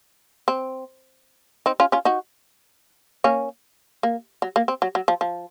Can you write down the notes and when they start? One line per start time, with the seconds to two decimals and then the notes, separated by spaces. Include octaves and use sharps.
0.48 C4
1.66 C4 D#4
1.80 C#4 F4
1.92 C#4 F4
2.05 D#4 F#4
3.24 A#3 C#4
4.03 A#3
4.42 F#3
4.56 A#3
4.68 C4
4.82 F#3
4.95 F#3
5.08 F3
5.21 F3